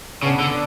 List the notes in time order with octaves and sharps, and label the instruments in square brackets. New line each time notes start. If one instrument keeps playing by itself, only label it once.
[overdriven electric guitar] C#3 [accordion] B3 D4
[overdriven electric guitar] D3